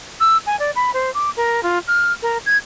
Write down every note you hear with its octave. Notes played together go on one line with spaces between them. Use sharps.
E6
G#5
D5
B5
C5
D6
A#4
F4
F6
A#4
G#6